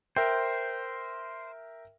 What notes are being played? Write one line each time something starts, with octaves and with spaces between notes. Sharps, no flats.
A#4 C5 E5 G5